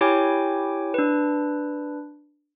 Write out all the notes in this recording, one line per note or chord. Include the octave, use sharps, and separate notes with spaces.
E4 G4 C#5 G5 G#5 D6
D4 B4